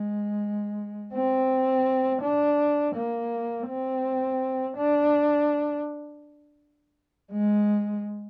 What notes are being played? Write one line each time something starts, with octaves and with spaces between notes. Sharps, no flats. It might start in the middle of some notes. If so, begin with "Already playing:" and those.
Already playing: G#3
C4
D4
A#3
C4
D4
G#3